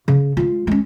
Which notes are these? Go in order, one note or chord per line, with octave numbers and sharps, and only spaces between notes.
C#3
G#3 F4
G#3 C#4